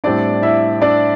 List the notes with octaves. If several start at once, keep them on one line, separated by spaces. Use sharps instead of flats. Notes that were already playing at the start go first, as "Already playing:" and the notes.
A2 G3 C4 D4 E4 D5
E4 E5
D4 D5